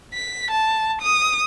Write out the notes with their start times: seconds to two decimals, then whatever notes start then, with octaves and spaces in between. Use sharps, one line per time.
0.14 B6
0.51 A5
1.02 D#6